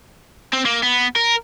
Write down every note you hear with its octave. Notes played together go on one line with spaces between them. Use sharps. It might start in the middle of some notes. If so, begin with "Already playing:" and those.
C4
A#3
B3
A#4